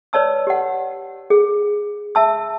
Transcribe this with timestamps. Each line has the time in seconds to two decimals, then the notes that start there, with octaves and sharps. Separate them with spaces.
0.13 B4 C#5 D5 A5 E6
0.47 G4 F#5
1.30 G#4
2.15 E5 A5 E6